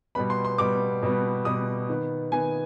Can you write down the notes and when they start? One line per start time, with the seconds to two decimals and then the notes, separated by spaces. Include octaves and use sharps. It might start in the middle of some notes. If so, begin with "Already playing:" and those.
0.15 B2 G3 B3 B5
0.30 C6
0.45 C6
0.58 B2 G3 B3 D6
1.03 B2 G3 B3
1.45 B2 G3 B3 D#6
1.89 D#3 B3
2.32 D#3 B3 G#5